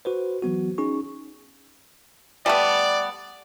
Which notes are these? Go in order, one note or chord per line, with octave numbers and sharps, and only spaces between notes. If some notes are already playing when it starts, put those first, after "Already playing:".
F#4 B4 C5
E3 F#3 B3 F#4
C#4 D#4 G#4 C#6
G3 A3 B3 D5